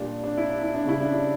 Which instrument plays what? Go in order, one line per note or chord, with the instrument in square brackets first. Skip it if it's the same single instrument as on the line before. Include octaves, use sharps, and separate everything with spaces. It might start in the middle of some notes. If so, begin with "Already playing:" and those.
Already playing: [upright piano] A#2 G3 D4
D4
E4
D4
E4
D4
C#3 G3 E4
D4
E4